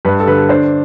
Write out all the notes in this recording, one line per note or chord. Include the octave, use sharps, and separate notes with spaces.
G2 B4
A4
D3 B4
D4 C5